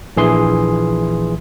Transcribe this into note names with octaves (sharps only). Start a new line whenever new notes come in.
A#1 E3 G#4 C6